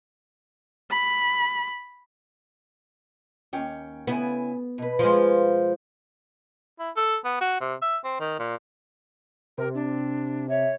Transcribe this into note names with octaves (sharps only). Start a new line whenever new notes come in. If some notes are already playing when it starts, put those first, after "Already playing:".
B5
D#2 C#4 G5
C#3 B3 E4 G#5
B2 B4
F3 G#3
E4
A4
B3
F#4
C3
E5
C4
D#3
A#2
C3 A#4
D4
C#5 E5